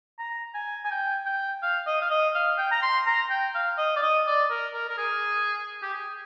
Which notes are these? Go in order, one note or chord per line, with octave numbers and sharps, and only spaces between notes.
A#5
G#5
G#5
G5
G5
F5
D#5
F5
D#5
F5
G5
A#5
C6
A#5
G5
F5
D#5
D5
D#5
D5
A#4
A#4
A#4
G#4
G4
G#4